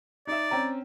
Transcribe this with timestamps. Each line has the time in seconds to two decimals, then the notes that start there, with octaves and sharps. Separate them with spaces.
0.27 D#4 D5 E5
0.51 C4 C#4 A#5